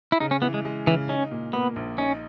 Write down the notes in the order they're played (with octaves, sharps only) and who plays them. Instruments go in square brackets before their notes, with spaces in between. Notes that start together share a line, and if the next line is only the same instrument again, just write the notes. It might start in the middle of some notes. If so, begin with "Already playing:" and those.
[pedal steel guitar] E4
[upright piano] C#3 [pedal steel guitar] D#4
[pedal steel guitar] C#4
[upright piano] E3 [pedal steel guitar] B3
[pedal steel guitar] G#3
[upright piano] G#3
[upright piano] C#3 [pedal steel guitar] E3
[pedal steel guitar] C#4 [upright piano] D#4
[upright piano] A#2
[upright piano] A#3 [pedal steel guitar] B3
[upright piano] A#1
[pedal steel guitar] C#4 [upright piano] D#4